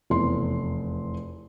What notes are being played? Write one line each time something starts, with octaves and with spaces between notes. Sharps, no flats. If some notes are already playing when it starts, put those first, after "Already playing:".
F1 E2 C6